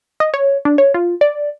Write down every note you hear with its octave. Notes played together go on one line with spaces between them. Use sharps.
D#5
C#5
D4
C#5
F4
D5